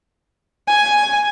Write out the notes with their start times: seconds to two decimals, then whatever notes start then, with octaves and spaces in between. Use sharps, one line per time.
0.67 G#5